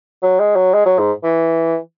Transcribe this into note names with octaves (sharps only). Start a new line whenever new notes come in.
F#3
G#3
F#3
G#3
F#3
G#2
E3